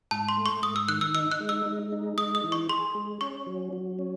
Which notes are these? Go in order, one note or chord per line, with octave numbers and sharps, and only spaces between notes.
G#2 A5
C6
A3
C#6
G#2 D#6
E6
D#3 F#6
E6
D#4 E6
F#6
G#3
E6
G#3
D#4
G#3 D#6
D#6
E3
C#6
G#4 C6
G#3
C#4 C#6
F#3
F#3
C#4